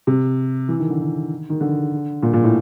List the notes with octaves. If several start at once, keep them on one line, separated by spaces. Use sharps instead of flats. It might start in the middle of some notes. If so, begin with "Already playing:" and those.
C3
E3
D#3
D3
D#3
D#3
D3
A#2
A#2
A2